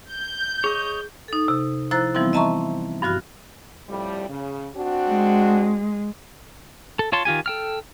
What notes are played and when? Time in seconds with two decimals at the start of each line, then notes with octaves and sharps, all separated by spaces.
0.11 G6
0.64 G#4 C#5 D#5 C#6
1.28 D#4 A4
1.48 C3
1.91 F3 E4 C5 A#5 F#6 A6
2.15 E3 F3 G3 B3 C4 E4
2.33 D#5 E5 A5 A#5 C6 C#6
3.02 G2 F3 F#4 F6
3.89 F2 A2 G3
4.29 C#3
4.76 C4 D4 F#4
5.08 G#3
6.99 A4
7.12 F4 C#5 A5 C6
7.25 D#3 F4 G4 G#5
7.46 A4 G5 F6